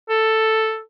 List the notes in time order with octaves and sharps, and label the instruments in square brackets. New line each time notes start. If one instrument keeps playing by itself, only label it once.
[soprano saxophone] A4